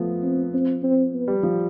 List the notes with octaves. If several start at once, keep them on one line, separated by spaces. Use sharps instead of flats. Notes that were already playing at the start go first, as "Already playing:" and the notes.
Already playing: F3 A3 B3
C4
C4
C4
B3
G3
F3